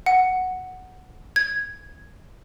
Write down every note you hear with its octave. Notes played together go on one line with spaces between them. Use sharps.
F#5
G#6